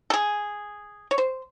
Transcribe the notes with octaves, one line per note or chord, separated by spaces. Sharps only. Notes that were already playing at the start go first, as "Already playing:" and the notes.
A4
G#4
C#5
C5